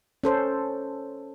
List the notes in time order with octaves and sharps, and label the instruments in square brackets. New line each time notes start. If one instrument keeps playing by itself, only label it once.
[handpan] C#4 A4 C5